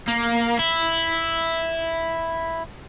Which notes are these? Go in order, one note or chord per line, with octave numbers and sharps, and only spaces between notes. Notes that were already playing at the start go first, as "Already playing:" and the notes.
A#3
E4